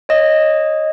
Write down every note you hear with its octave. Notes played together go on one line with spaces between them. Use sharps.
C#5 D#5